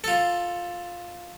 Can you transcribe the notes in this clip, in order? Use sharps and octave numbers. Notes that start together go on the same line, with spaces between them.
F4 A4